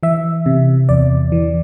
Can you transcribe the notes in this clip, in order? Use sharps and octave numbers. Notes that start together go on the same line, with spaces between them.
E3 E5
C3
E2 D5
E3